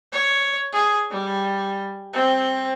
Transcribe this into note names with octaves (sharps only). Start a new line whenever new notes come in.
C#5
G#4
G3
C4